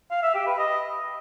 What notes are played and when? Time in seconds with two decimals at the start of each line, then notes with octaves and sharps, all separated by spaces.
0.11 F5
0.23 E5
0.35 G4
0.47 B4
0.58 D#5